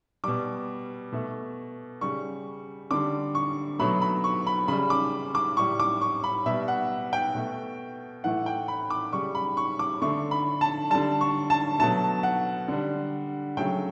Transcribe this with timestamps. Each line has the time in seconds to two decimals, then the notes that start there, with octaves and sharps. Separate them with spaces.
0.24 B2 G3 D6
1.12 B2 A3
2.01 C#3 G3 C#6
2.91 D3 G3 D6
3.35 C#6
3.79 B2 F#3 A3 B5
4.02 B5
4.24 C#6
4.47 B5
4.68 C#3 G3 B5
4.90 D6
5.35 D6
5.57 A2 G3 C#6
5.80 D6
6.01 C#6
6.24 B5
6.46 B2 G3 E5
6.68 F#5
7.13 G5
7.35 B2 A3
8.24 A2 E3 A3 F#5
8.46 G5
8.68 B5
8.90 D6
9.13 C#3 G3 C#6
9.35 B5
9.57 C#6
9.79 D6
10.02 D3 A3 C#6
10.31 B5
10.61 A5
10.90 D3 G3 A5
11.21 C#6
11.50 A5
11.79 B2 F#3 A3 A5
12.23 F#5
12.68 D3 G3
13.57 C#3 F#3 A3 G5